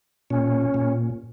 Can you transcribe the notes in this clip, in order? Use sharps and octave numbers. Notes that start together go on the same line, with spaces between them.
A#2 C#4
A#2